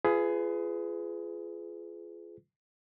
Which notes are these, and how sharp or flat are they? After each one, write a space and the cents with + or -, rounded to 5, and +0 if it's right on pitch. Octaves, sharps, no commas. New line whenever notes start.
F4 -25 G#4 +15 B4 +25